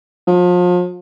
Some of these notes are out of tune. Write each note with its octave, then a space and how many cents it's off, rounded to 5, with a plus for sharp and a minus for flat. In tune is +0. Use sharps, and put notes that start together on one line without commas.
F3 +35